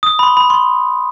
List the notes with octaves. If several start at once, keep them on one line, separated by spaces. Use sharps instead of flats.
D#6
B5
C6
B5
C6